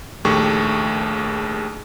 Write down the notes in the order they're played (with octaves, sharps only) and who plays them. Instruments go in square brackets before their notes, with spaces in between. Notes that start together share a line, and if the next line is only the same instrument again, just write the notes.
[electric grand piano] A#1 D#2 A3 G4 G#4 C#6